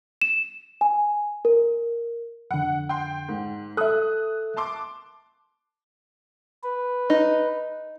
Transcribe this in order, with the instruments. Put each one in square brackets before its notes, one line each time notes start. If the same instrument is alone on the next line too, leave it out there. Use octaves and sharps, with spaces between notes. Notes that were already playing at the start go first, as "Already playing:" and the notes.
[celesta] E7
G#5
A#4
[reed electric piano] F2 D3 [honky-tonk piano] F#5
[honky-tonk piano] G5 C6
G#2
[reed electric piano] A4 E5 [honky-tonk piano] D#6 F#6
[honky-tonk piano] A5 C6 D6
[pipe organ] B4
[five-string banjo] D#4